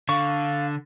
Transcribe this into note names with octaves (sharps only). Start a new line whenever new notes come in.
D3 F5 C#6